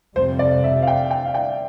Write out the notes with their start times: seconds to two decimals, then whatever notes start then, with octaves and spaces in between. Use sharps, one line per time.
0.16 F2 C3 G3 C5
0.39 D5
0.64 E5
0.82 F5
0.87 G5
1.11 G5
1.25 F5
1.34 G5